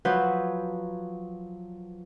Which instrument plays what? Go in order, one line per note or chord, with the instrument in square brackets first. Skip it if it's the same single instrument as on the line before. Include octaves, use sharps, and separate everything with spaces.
[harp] F3 F#3 B4 F#5 G6